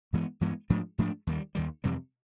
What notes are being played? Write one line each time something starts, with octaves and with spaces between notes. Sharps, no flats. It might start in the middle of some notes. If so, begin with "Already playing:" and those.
G2 E3 G#3 B3
G2 E3 G#3 B3
G#2 F3 A3 D4
G#2 F3 A3 D4
D#2 D#3 G3
D#2 D#3 G3
F2 C3 E3 G3